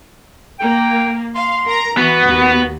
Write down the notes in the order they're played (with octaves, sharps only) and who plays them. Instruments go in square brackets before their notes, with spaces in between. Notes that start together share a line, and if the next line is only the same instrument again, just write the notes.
[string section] A#3 [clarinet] G5
[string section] F5 [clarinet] C6
[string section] A#4 A#5
[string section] E3 [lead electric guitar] B3 [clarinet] F#4
[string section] D#2